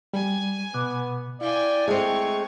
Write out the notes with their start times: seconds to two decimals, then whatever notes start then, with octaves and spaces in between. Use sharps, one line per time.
0.13 G3 G#5
0.74 B2 B3 D6 F#6
1.41 E4 D5 F5 G5 G#5
1.88 G#3 A3 C4 C#5